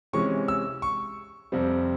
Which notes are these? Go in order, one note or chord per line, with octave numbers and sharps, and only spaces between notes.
C3 E3 G#3 C#4 C#6
E6
C#6
F2 C3 G3 C4